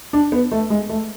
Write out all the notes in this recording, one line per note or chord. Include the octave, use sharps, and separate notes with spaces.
D4
B3
A3
G#3
A3